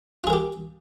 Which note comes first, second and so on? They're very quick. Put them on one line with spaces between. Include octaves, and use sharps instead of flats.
F4 G#4 A#4 G4